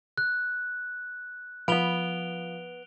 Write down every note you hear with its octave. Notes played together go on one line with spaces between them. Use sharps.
F#6
F3 B3 B4 D7 F7 G7